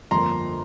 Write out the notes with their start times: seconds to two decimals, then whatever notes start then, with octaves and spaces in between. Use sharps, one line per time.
0.11 G1 F2 D3 F3 A#3 A#5 C6